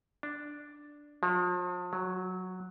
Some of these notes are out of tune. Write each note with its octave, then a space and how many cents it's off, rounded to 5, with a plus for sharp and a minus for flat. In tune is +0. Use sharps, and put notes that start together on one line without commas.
D4 +0
F3 +40
F#3 -5